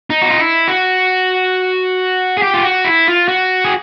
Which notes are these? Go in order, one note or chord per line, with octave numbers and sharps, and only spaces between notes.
D#4
F#4
F4
E4
F#4
G#4
G4
F4
F#4
E4
F4
F#4
G#4